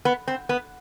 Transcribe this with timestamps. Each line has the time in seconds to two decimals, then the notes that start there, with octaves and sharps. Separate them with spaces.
0.05 B3
0.28 C4
0.49 B3